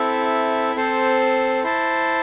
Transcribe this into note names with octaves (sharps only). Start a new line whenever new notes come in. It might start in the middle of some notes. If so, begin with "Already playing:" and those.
Already playing: C4 E4 A4 E5
C4 A4 C5
E4 C5 A5